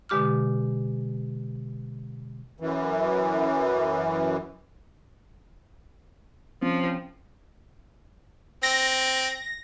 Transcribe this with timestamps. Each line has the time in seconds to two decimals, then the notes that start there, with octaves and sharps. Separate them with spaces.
0.09 B2 D3 G#3 G4 D6 F6
2.60 F#2 E3
6.62 F3 C4 C#4
8.63 C4 A#6